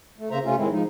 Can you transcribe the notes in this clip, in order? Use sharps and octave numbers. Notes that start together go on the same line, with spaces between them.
A3
C#3 A#3 C5 E5 A#5
C3 A3 C#4 F4
A2 D#3 G#3 C4 E4
F3 G#3 D#4